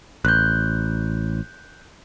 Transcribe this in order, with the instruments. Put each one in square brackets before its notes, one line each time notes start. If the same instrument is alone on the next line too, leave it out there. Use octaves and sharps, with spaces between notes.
[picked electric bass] A1 [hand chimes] F#6 G6